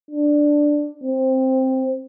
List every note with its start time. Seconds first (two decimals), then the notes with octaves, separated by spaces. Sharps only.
0.11 D4
1.03 C4